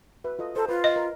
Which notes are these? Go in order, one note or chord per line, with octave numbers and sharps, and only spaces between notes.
F#4 B4 E5
F4 A4 D#5
A4 C5 A#5
F4 B4
D#5
A#4